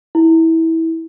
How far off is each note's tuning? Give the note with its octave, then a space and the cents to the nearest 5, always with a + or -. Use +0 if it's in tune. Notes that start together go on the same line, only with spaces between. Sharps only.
E4 -20